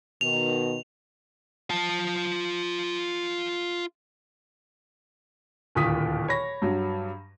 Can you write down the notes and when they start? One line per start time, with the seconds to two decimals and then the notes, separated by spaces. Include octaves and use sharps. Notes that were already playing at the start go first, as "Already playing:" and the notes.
0.21 B2 D#3 F7
1.70 F4 A5
5.75 D1 D#2 A#2 D#3 D#6 B6
6.28 C#5 B5 A#6
6.62 G2 F#3